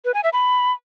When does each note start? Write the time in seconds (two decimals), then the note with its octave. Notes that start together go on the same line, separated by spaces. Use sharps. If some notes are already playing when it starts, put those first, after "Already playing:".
0.05 B4
0.14 G#5
0.24 E5
0.33 B5